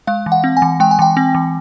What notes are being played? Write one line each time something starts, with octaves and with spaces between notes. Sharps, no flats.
G#3 F5
E3
F#5
C4
G#5
E3
G#3 G5
G#5
E3 G5
C4
E3